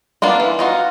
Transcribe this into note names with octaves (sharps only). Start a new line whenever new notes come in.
A#3 B3 D4 F4
E3
D#4 F4 F#4